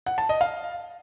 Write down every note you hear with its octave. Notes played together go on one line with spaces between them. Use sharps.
F#5
A5
D#5
F5